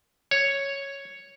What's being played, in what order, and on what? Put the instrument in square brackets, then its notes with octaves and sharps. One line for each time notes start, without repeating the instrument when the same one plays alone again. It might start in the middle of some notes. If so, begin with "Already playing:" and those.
[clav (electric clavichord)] C#5